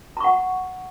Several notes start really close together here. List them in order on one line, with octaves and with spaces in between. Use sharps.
A#5 C#6 F#5